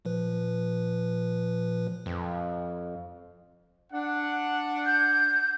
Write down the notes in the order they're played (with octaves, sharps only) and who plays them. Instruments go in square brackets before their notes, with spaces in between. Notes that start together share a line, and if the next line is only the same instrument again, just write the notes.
[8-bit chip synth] A#2 F3 B4
[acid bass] F2
[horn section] D4 F#5
[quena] G6